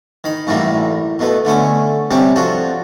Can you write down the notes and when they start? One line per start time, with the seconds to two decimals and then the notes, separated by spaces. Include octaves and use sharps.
0.24 D#3 B5
0.47 F#2 A2 E3 G3 A#3
1.19 B2 A3 B4
1.45 D3 A3 C#4 G#5
2.11 C3 G3 C4 C#4 G4
2.36 F3 D4 F#4 A4